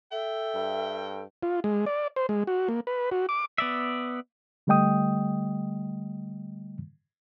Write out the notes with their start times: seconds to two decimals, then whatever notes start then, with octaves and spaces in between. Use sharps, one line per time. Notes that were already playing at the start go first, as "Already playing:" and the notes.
0.12 A4 E5 G5
0.55 G2
1.43 F4
1.64 G#3
1.86 D5
2.16 C5
2.29 G#3
2.47 F#4
2.68 A#3
2.87 B4
3.12 F#4
3.29 D6
3.58 B3 D5 E5
4.67 D3 G3 A3 D#5 G5 D#6